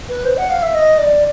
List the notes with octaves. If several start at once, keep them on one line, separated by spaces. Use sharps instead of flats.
B4
C5
F#5
F5
E5
D#5
D5